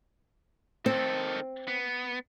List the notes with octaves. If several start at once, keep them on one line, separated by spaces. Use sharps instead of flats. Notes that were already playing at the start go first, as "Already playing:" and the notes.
D#3 C4 A4
B3